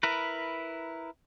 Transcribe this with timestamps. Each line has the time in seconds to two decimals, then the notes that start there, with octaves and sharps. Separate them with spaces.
0.03 E4 A#4 B4